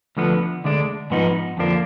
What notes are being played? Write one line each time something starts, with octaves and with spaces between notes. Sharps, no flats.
D2 D3 F3 B3
D2 D3 G#3 D4
G#2 F3 B3 D#4
F2 D3 F3 A#3 D4